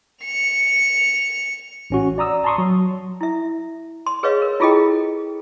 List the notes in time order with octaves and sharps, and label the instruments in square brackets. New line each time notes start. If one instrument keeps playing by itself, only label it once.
[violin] C#7 F7
[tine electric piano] A1 C#4 F#4
D5 A#5 D#6 E6
A5 A#5 C6 C#6 D#6
F#3
[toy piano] E4 E5
C6
G#4 B4 C#5 D#5 F5
A#4
E4 F4 G#4 A4 D#5 G5